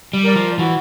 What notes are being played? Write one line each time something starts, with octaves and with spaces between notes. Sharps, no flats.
G3
A#4 D5
F3
E3 F#4